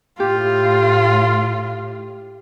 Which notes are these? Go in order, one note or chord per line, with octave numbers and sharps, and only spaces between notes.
A2 F4 G4